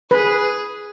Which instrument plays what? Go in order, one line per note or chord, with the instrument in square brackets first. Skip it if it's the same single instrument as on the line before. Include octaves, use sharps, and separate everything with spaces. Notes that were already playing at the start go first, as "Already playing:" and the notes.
[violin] G#4 [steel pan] B4